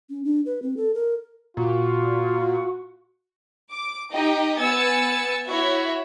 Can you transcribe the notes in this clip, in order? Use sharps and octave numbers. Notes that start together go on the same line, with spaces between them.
C#4
D4
B4
C4
A4
A#4
A#2 F4 F#4
D6
D#4 G4 D#5 G5
B3 G#5 E6 A6 C#7
E4 F#4 C#5 E5